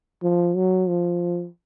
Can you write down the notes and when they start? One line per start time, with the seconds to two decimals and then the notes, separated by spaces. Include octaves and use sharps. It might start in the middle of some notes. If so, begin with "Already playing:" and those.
0.23 F3
0.56 F#3
0.88 F3